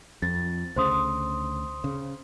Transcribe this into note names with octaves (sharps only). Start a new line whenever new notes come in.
F2 A6
D2 C#3 C5 C6 D#6
C#3